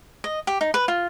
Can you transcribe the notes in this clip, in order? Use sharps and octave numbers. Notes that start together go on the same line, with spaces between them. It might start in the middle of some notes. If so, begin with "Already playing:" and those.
D#5
G4
D#4
B4
F4